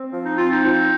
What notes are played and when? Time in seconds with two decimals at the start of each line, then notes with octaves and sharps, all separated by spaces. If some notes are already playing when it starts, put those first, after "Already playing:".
Already playing: C4
0.12 F3
0.25 D#4
0.38 C4 F4
0.52 D#4
0.64 F3